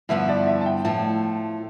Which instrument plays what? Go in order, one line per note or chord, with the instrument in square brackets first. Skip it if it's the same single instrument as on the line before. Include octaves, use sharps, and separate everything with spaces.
[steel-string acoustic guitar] G2 D3 F3 B3 E4 [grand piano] E5
[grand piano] D5
E5
A5
G5
[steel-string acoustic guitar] A2 F3 A3 [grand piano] A5